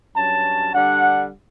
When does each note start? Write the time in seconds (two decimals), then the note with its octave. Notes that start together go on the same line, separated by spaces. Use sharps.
0.16 G2 F#3 C#4 A5
0.74 D3 G3 D4 F#5